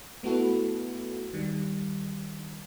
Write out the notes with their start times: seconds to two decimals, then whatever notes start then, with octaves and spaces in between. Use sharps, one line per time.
0.23 A3 B3 E4 F#4 A4 B4
1.34 D#3 G3